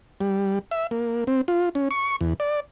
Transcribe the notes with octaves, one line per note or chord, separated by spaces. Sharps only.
G3
E5
A#3
C4
F4
C#4
C#6
E2
D5